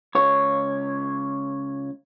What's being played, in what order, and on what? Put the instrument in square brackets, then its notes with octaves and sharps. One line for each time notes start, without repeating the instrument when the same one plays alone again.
[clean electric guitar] C#2 C#5